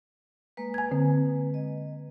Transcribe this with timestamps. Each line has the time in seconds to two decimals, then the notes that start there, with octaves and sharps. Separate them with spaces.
0.57 G#3 A#3 B4
0.74 G#5 G#6
0.91 D3 C4
1.54 D#5